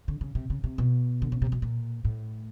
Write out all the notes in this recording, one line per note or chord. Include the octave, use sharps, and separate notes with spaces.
D3
C#3
C3
C#3
C3
B2
D3
C#3
C3
B2
A#2
A2